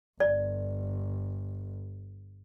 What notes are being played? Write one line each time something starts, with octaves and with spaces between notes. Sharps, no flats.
G1 D5